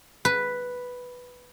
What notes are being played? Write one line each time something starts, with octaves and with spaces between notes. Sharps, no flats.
B4